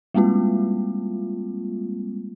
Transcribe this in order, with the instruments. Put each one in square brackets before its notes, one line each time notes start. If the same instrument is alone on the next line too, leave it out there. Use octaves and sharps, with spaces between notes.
[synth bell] G3 G#3 A#3 C4 F4